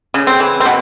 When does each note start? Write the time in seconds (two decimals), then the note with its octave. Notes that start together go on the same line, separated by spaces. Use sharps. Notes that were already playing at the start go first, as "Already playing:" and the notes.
0.14 C#3
0.27 C4
0.40 E3
0.60 C4
0.65 B2